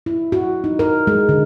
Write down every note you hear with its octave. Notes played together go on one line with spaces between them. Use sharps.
E4
F#4
D#4
A#4
G#3
D3